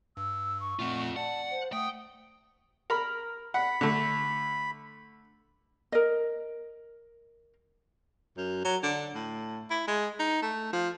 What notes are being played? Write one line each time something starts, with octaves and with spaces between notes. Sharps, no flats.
G2 E6
C#6
A#2 A3 C4 F4 F#5
D5 F#5 A5
C5
A3 F#5 G5 D#6
A#4 B5
F#5 B5
D3 A3
A#4 D#5
F#2
F#3
D3
A2
E4
G#3
D#4
A3
F3